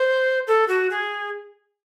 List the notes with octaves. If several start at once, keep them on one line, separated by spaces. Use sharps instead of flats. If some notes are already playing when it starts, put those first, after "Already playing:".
Already playing: C5
A4
F#4
G#4